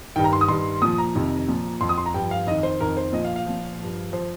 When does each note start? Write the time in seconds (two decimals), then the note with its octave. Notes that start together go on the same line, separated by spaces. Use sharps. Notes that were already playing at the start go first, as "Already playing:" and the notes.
0.16 G2 D#3 G5
0.24 A#5
0.33 C6
0.41 D#6
0.48 G2 D#3 C6
0.82 A#2 F3 D#6
0.98 A#5
1.15 F2 C3 D#3
1.49 A#2 F3
1.81 F2 F3 C6
1.89 D#6
1.98 C6
2.06 A#5
2.14 G2 F3 G5
2.31 F5
2.47 F2 D#3 D#5
2.63 C5
2.81 F2 D#3 A#4
2.97 C5
3.13 A#2 F3 D#5
3.25 F5
3.36 F5
3.46 A#2 F3
3.80 G2 F3
4.12 F3 C5